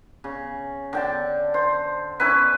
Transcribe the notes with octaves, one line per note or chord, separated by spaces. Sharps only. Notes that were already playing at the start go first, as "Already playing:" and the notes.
C#3
D3 G5 A5
C5
C#4 E4 B4